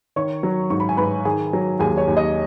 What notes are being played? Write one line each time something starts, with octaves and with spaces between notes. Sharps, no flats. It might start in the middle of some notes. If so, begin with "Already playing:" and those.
D#3 C#5 C#6
F#3
G#2 C#6
B5
G#5
G#2 B4 B5
D#3 G#4 G#5
F#3
D#2 G#4 G#5
C#5
D#2
D#5